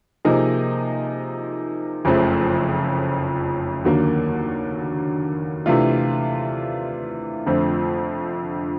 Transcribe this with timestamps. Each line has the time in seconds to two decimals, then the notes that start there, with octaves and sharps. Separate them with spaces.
0.25 C3 F3 A#3 D#4 G#4
2.05 F#1 F2 C#3 F3 A3
3.85 D#2 D3 F#3 A#3
5.66 C3 E3 A3 D4 F4
7.46 F2 D3 F3 A3 C4